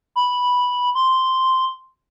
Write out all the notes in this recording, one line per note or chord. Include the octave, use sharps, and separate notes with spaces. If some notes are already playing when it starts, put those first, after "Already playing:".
B5
C6